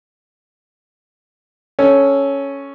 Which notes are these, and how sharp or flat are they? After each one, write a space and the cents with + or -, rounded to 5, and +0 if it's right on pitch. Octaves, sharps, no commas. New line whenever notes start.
C#4 +0 A4 -10